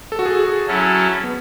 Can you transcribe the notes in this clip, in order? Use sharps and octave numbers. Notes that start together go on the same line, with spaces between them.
A4
F#4
G#4
G#4
F#3 C#4 E4 A4
B3